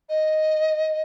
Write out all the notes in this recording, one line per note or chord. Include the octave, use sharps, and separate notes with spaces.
D#5